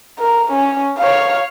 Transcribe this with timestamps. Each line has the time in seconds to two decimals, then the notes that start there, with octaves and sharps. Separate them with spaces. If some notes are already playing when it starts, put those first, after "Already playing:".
0.19 A#4
0.52 C#4
0.99 C#5 F5